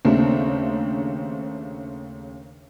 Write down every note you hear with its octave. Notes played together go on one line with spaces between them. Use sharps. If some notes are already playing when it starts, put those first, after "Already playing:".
D#2 C#3 A3 C4 D4